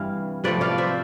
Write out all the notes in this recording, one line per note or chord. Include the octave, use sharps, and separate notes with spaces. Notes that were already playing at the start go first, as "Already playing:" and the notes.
Already playing: G2 C3 E3 G3 F5
C3 F3 A3 B4 D5
D5 F5
C5 E5